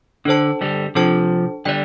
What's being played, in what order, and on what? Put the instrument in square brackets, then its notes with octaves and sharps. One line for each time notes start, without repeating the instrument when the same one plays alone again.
[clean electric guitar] D3 [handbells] D4 A4 C5 A5
[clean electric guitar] D3 G3
[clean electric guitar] C3 F3 [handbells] D4 A4 C5 A5
[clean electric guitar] D3 G3 [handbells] D5 G5